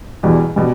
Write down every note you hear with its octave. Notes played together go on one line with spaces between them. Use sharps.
E2 B2 G3
B2 G3